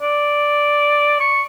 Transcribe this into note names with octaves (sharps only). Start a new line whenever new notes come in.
D5
C#6